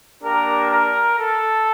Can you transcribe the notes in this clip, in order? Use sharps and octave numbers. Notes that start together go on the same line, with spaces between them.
A#3 D4 G4 A#4
A#4
A4